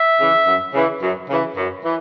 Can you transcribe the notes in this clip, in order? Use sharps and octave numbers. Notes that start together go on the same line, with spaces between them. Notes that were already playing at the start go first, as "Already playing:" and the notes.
Already playing: E5
C#3 E3
F#2
C#3 E3
F#2
C#3 E3
F#2
E3